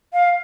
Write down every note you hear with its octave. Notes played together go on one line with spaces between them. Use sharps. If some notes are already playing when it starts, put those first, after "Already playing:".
F5